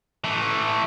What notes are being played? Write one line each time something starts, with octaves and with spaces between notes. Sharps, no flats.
E3 A3